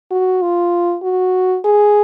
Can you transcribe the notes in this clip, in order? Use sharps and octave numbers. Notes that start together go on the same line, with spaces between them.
F#4
F4
F#4
G#4